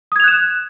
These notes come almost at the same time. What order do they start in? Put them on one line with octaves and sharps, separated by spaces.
D#6 G#6 F7 F#6 E7